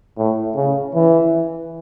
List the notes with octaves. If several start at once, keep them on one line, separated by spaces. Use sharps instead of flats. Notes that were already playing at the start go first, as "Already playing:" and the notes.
A2
C#3
E3